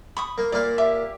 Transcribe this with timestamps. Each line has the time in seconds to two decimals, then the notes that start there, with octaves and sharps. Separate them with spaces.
0.17 B5 C#6 D#6
0.38 A#3
0.52 A#2 A#3 D5 F5
0.78 G4 E5 D6